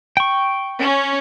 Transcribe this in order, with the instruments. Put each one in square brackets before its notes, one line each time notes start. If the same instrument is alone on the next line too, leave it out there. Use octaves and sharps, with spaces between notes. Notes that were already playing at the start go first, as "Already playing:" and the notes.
[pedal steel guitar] G5 C#6
[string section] C#4